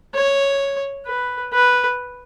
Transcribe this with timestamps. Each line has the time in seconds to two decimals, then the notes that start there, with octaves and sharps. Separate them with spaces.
0.14 C#5
1.07 B4
1.53 B4